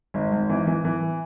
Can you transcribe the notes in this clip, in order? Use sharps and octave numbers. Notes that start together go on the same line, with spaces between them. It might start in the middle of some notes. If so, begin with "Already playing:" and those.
G#1
G#1
E3
E3
E3